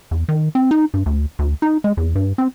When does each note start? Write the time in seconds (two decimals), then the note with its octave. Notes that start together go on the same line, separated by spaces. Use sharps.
0.11 E2
0.29 D#3
0.55 C4
0.71 D#4
0.94 G2
1.06 D2
1.39 D2
1.62 D#4
1.84 G#3
1.97 E2
2.15 G2
2.38 C4